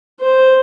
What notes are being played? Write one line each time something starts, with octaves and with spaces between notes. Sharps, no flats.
C5